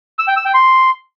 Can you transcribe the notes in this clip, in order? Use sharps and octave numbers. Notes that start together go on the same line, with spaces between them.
E6
G5
E6
G5
C6